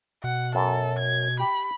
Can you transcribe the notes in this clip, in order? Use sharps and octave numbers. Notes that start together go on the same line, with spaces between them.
B2 F#5
F#2 A4
G#6
G4 B5